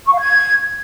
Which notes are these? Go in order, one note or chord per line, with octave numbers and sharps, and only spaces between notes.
C#6
F5
G#6